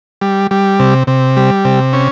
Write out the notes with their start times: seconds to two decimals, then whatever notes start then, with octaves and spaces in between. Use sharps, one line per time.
0.21 G3
0.51 G3
0.80 C3
1.07 C3
1.37 G3
1.65 C3
1.93 C#4